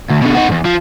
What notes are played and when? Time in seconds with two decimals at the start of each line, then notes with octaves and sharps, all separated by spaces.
0.09 D2
0.21 B2 D3
0.35 D#4 F#4
0.48 E2 G#2
0.65 F3